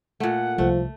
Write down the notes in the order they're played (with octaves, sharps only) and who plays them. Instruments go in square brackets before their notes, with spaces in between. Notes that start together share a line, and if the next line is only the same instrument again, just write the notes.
[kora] A#2 A3 [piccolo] F#5
[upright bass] C2 [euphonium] F3 [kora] A3